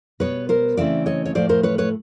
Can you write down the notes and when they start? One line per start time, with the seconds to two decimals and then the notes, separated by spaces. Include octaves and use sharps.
0.20 B2 G3 B3 B4 C#5
0.49 A#4 C5
0.77 C#3 E3 A3 C4 D5 E5
1.06 C#5 D#5
1.26 C#5
1.35 A2 F3 A3 C5 D5
1.49 A#4 C5
1.63 B4 C#5
1.78 B4 C#5